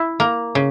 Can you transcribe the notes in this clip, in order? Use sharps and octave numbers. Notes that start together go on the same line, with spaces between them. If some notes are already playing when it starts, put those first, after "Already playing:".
Already playing: E4
A#3
C#3